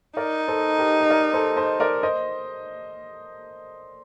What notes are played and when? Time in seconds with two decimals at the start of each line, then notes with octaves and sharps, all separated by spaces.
0.17 D#4 A#4 D5
0.48 A4 C5
0.78 G4 A#4
1.01 D#5
1.10 A#4 D5
1.34 A4 C5
1.56 C5 D#5
1.80 A#4 D5
2.03 C5 D#5